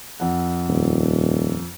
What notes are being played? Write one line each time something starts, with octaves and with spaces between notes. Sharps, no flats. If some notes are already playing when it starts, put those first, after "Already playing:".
F2 F#5
D#1